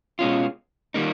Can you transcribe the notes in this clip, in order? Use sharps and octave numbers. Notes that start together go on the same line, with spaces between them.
B2 G#3 C#4 F4
D#3 G3 A#3 D#4